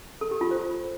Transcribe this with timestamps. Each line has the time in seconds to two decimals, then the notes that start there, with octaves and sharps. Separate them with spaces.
0.21 A4
0.31 G4
0.41 F4
0.51 C5